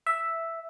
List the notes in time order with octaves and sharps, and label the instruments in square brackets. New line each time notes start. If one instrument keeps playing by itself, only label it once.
[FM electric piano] E5